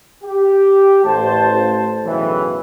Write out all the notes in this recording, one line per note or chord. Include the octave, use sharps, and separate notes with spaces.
G4
A1 A3 C5 A5
B1 F#2 A2 C#3 E3